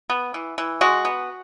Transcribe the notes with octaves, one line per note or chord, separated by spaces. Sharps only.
B3
E3
E3
G#3 F#4
B3